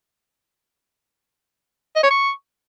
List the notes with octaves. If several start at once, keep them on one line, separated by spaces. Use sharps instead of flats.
D#5
C#5
C#6